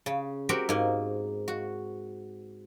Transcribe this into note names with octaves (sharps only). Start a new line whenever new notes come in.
C#3
C4 F#4 G4 A#4
G#2 A#3
F#4